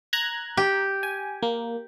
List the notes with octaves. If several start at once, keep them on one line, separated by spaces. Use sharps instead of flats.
A#5 F#6 G#6
G4
G#5
A#3